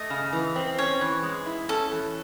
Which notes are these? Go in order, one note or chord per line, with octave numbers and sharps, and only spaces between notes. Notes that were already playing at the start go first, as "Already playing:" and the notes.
Already playing: A3 D#5
C#3
E3
C4
C#4 C#5
E3
G#3
E4
C#4 A4
E3